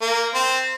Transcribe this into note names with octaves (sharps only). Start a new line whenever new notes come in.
A#3
C4